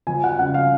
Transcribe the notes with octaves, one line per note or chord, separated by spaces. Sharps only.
F3 G#5
F#5
C#3 F#5
F5